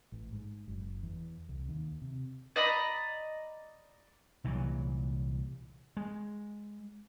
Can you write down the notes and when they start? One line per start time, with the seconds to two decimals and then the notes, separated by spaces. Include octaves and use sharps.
0.12 A1
0.32 G#2
0.67 F#1
1.03 E2
1.49 C2
1.68 D#2
2.02 C3
2.56 D5 D#5 A#5 B5
4.44 C2 A#2 E3 F#3
5.97 G#3